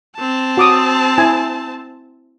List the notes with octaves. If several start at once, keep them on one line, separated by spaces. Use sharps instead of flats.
C4 A5
F#4 D6 D#6
E4 G#5